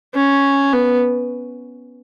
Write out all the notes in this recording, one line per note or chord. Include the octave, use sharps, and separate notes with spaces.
C#4
B3